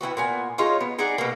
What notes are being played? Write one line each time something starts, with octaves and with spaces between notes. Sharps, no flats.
E3 G3 B3 F#4
A#2 B3 G#5
G#3 D#4 F4 C#5
B3
D#4 G#4 D5 F#5
B2 A#3